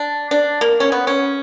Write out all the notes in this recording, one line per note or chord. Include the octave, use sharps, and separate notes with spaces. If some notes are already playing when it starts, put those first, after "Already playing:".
Already playing: D4
D4
A#3
C#4
B3
C#4